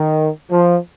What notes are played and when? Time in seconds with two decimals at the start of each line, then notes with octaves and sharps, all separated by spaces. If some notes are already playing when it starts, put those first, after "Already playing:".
Already playing: D#3
0.51 F3